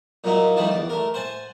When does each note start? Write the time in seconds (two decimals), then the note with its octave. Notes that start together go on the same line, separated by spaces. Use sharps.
0.24 A#2 F#3 A#3 D#4 E4
0.56 D#3 F3 G3 A3 D#4 E4
0.70 E2 D5
0.89 A3 A#4
1.14 C5 F#5 G#5 A5